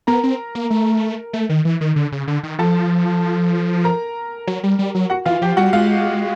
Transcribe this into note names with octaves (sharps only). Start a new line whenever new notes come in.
B3 A#4 A#5
C4
A#3
A3
A3
D#3
E3
D#3
D3
C#3
D3
D#3
F3 A4 A5
A#4 A#5
F#3
G3
G3
F#3
F#4 F#5
E3 F4 F5
F3 G4 G5
G3 F#4 F#5
G#3 F4 F5